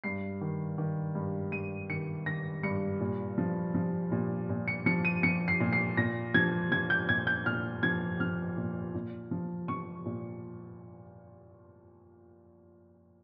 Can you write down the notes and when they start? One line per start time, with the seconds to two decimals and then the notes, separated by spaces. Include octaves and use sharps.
0.04 G2 C7
0.41 D#3
0.78 D#3
1.15 G2
1.52 G2 D#7
1.90 D#3 C#7
2.26 D#3 A#6
2.63 G2 C#7
3.01 A#2
3.38 F3
3.75 F3
4.12 A#2
4.49 A#2
4.68 C#7
4.86 F3 C#7
5.05 D#7
5.23 F3 C#7
5.48 C7
5.60 A#2
5.73 C7
5.97 A#2 A#6
6.34 F3 G#6
6.71 F3 G#6
6.90 G6
7.09 A#2 G#6
7.27 G6
7.46 A#2 F6
7.83 F3 G#6
8.20 F3 F6
8.57 A#2
8.95 A#2
9.31 F3
9.68 F3 C#6
10.06 A#2